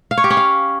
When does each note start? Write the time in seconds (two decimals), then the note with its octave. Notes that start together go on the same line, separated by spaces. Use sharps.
0.11 F5
0.17 C#5
0.24 G4
0.30 C#4
0.37 F5